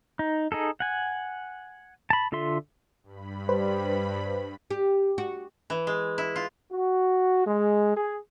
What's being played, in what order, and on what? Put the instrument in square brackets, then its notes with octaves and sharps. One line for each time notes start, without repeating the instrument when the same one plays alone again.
[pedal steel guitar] D#4
D#4 G#4 A4
F#5 G#5
A5 B5
D3 F4 A4 E5 C6
[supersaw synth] G2 B5
[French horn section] G3 [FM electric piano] B4 C5
[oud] G4
F#4
[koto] E3
G#3
E4
F4
[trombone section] F#4
G#3
G#4